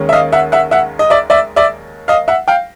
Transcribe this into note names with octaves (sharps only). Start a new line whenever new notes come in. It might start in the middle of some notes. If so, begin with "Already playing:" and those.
Already playing: D#2 D#3 G#3 C#4
E5
D#5 F5
E5 F#5
E5 F#5
E5 F#5
D#5
D5 E5
D5 E5
D5 E5
D#5 F5
E5 F#5
F5 G5